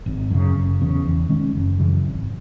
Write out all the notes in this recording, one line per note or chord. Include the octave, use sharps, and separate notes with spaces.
G#1
F#2 C#3
F#1
E2 C#3
E2
D#3 G#3 C#4
F#1
F#2 C#3 E3
G#1